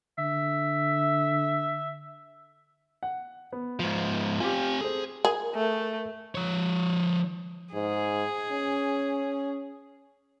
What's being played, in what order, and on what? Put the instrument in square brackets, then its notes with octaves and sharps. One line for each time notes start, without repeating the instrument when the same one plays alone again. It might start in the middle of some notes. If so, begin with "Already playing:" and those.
[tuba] D3 [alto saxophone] E5
[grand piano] F#5
B3
[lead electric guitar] G#2 F3
[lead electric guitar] C4 G#5 [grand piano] F4 G4
[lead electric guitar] G#4 [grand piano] A4 C5
[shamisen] G#4 [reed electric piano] A#4
[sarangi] A3
[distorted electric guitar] F3 C#5
[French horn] G#2 [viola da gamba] G#4
[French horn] C#4